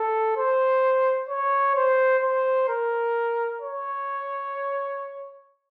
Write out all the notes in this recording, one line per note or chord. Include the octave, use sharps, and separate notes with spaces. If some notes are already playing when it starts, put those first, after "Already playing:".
Already playing: A4
C5
C#5
C5
C5
A#4
C#5